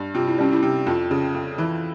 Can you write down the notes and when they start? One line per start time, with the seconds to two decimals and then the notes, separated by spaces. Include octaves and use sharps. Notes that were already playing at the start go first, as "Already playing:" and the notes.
Already playing: G2
0.14 C3 F4
0.27 E4
0.38 G3 C#4
0.52 E4
0.63 C3
0.86 F2 F4
1.11 C#3
1.34 F2
1.58 E3